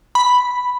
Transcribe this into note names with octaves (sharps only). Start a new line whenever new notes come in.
B5